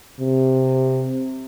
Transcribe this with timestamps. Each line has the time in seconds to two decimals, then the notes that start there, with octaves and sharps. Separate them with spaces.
0.20 C3